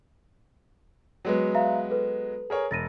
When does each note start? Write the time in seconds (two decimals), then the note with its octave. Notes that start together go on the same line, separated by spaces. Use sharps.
1.25 F#3 G#3 B3
1.55 E5 F5 A#5
1.90 A4 B4
2.50 G#4 A#4 C#5
2.71 E1 A6 A#6 D#7